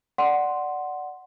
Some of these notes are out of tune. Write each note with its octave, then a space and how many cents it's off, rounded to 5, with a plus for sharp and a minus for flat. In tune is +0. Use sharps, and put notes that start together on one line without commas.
D5 +0 F#5 +0 C6 +0